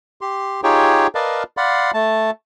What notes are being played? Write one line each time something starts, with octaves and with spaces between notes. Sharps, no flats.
G4 C6
D#4 F4 G4 G#4 C#5 G5
A#4 B4 D5 D#5 F5 A5
D5 F5 F#5 B5 C6
A3 A5